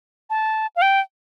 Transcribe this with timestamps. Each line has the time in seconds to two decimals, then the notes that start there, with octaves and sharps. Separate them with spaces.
0.30 A5
0.76 F5
0.82 G5